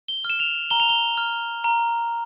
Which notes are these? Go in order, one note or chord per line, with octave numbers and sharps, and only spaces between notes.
G7
F6 E7
F7
A#5 G7
F7
G7
F6
A#5